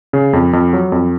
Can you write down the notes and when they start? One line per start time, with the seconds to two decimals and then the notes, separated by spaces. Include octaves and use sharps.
0.13 C#3
0.33 F2
0.53 F2
0.73 F#3
0.92 F2